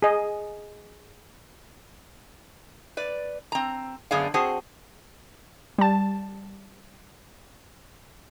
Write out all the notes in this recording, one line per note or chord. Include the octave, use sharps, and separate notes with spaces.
G#4 D#5
B4 D5
C4 A#5
F#2 D3 B3 G#4 D5 F5
C4 F#4 G#4 C5 F#5 A5
G3 A5